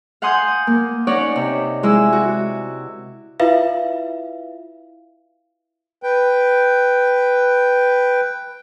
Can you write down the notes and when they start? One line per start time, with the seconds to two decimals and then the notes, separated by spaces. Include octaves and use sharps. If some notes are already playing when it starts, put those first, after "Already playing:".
0.22 F5 F#5 G#5 C6 D#6 G6
0.67 A#3
1.07 C#4 D#4 C#5 D5 F#5
1.36 C3
1.83 G#3 E4 E6
2.12 F#4
3.40 E4 F4 B4 E5 F5
6.03 B4 G5